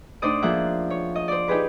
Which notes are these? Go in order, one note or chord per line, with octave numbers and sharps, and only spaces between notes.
A2 D4 D#4 C5 D5 D#6
F3 A#3 G#4 E5 F#5
C#5
D#5
C5 D5
D#4 G4 G#4 B4